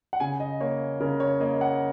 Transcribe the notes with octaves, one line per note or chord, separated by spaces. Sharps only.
F#5
C#3 G#5
D#5
A#3 C#5
C#3 A#4
C#5
A#3 D#5
F#5